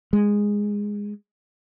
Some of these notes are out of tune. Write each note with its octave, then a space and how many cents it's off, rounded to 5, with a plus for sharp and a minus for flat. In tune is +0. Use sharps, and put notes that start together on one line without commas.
G#3 -10